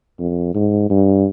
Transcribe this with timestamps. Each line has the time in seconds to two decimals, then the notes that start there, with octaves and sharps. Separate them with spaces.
0.19 F2
0.54 G#2
0.90 G2